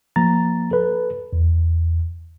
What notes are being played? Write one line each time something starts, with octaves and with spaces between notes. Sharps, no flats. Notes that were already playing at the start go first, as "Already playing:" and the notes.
F3 A#3 A#5 A6
A4 B4
E2